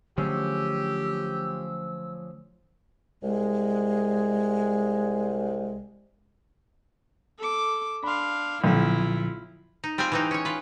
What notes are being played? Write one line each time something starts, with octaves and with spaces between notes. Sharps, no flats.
D3 F3 F#3 A3 C#4 G4 G#4 E6
C2 G#3
A4 D6
D4 F5 B5 C6
B1 A#2 D3 F3 E4 F4
D#4
G3 C4 F4 G#4 G#5
E3 C4 D#4
C#4 C#5
F4 B4